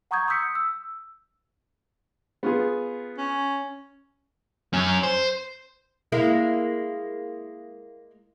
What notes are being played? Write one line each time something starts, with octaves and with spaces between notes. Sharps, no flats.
F#5 A#5 C#6 D#6 G6 G#6
C6 D#6 E6 G6 B6 C#7
E6
B3 F4 G#4
C#4
F#2 C#4
C5
G#3 A#3 E4